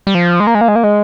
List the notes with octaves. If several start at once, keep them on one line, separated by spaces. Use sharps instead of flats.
G3
F3
G#3
A#3
G#3
A#3
G#3
A#3
G#3